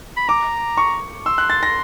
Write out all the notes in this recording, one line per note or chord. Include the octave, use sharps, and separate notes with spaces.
B5
A#5 D6
C#6
C6 E6
F#6
A6
A#6